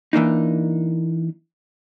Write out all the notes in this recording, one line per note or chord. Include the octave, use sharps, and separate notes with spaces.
E3 A#3 D4 D#4